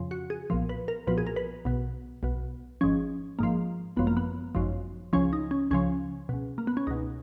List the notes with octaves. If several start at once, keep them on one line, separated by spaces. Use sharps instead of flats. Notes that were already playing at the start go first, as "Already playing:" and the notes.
Already playing: F2 C#3 F3
F#4
G#4
B1 A#2 F3
B4
A#4
B1 A#2 F3 B4
G#4
A#4
B4
B1 B2
B1 B2
G#1 G#2 F3 C#4
G#1 G#2 F3 A#3
G#1 F#2 F3 B3
A#3
B3
G#1 F#2 F3
C#2 C#3 F3 C#4
D#4
C#4
C#2 C#3 F3 C#4
C#2 B2
A#3
B3
C#4
C#2 B2 D#4